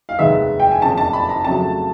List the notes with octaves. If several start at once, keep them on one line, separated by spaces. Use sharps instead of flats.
F5
F1 D#2 D#3 G#3 B3 E5
G5
G#5
F#1 F2 C#3 A5
A5
B5
A#5
F2 C#3 F#3 A3 A5